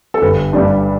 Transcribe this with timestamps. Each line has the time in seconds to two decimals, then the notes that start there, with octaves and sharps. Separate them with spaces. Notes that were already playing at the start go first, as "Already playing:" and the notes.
0.14 A4
0.22 G1 B4
0.53 G2 G3 D4